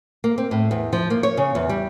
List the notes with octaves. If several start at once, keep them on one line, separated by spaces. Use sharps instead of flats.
A#3
C4
A2
E2
F3
A#3
C#5
C#3
E2
G3